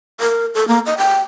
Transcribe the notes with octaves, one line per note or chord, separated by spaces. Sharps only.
A#4
A4
A#3
D#5
G5